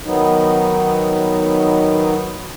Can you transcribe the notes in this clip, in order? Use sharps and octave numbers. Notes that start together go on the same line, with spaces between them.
D#3 F#3 B3 D#4